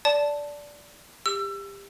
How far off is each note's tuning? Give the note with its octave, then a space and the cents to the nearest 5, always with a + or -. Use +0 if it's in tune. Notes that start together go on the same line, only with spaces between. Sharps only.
D5 -10 A5 +0
G4 +25 E6 +30